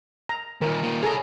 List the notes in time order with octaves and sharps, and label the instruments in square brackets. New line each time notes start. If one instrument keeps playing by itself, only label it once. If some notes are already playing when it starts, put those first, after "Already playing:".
[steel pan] A#5
[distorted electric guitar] D#2 A#2 [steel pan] A#4
[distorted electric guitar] A#2 D#3
[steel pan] G#4 A4 A#5 [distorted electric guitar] C#5 B5